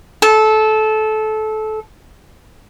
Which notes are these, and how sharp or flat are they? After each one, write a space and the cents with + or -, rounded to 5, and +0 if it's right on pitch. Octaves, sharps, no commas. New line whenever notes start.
A4 -20